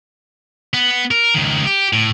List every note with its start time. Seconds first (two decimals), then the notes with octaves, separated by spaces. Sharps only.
0.74 B3
1.11 A#4
1.34 C#2 D#3
1.66 G4
1.93 A2